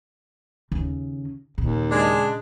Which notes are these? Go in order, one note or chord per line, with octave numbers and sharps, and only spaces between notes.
D#2 C#3
D#2 A#2 C#3
G#3 D4